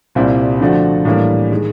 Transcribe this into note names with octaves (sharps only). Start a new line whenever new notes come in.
C2 A#2 G3 C4 E4
D3 F3 A3 D4 F#4
A2 E3 G3 A#3 D4
D#3 G#3